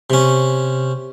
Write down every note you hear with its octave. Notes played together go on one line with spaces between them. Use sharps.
C3 C#4